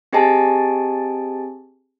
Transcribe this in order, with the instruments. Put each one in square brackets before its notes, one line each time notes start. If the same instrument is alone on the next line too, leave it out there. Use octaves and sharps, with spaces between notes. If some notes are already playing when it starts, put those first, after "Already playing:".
[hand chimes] C4 G4 G#4 D#5 G#5 A5